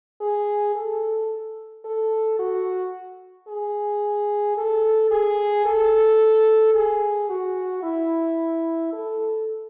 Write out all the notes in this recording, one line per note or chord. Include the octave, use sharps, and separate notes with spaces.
G#4
A4
A4
F#4
G#4
A4
G#4
A4
G#4
F#4
E4
A4